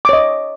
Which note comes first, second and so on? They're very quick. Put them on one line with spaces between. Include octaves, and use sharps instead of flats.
D6 C#5 D#5